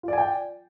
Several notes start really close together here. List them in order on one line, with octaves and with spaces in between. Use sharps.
F4 D5 G#5 G5